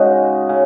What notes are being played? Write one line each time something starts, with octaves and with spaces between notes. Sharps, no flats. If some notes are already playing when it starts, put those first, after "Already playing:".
Already playing: C#3 G#3 D#4 F#4
C#3